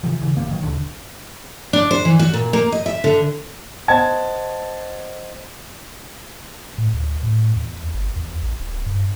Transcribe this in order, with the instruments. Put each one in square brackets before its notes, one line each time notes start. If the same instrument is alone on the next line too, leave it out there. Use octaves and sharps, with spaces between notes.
[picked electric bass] C3 E3 F3
C#3 E3
F#1 G2 A#3
D#3 F#3
D#1 C#2 D3
[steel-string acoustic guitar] D4
C5
E3
F#4
A#2
A#3
D#5
E5
D3
[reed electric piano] C5 D#5 F#5 [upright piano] A5 G#6
[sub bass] A2
D2
A2
E2
G1
E2
A1
D1
G2